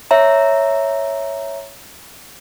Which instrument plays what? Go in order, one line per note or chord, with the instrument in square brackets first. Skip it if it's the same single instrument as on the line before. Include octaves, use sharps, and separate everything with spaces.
[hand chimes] C#5 E5 A#5